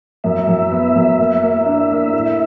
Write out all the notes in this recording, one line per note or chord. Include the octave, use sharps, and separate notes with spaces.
F#2 E5
F#2
B3
F#2
A#3
A#3
D4
A#3
A2